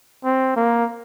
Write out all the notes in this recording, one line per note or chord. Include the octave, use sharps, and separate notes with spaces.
C4
A#3